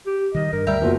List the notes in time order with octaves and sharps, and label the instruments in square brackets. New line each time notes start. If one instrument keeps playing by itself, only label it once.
[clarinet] G4
[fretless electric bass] D#3 E3 G3 [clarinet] D#5
[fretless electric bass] G2 [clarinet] A#4
[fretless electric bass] D2 [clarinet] G3 [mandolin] G4 A#4 E5
[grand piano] F#1 B2 F#4 [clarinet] F4